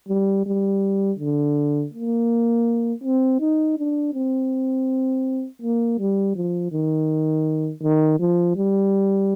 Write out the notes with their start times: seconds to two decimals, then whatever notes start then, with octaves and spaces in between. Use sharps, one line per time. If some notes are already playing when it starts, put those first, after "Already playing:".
0.09 G3
0.46 G3
1.19 D3
1.94 A#3
3.04 C4
3.40 D#4
3.78 D4
4.14 C4
5.62 A#3
5.99 G3
6.35 F3
6.72 D#3
7.83 D#3
8.20 F3
8.56 G3